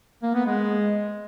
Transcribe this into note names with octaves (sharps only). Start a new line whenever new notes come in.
A#3
B3
G#3